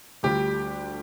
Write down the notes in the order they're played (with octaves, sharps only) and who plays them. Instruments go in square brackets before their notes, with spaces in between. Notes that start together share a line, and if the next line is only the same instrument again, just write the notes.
[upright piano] D2 D3 G3 D4 F4 [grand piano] G4